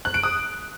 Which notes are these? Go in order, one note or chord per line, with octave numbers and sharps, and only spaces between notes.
F#6
D7
D#6